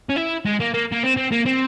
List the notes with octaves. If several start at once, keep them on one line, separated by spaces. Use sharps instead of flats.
C#4
E4
G#3
A#3
A#3
A#3
C4
C4
A#3
C4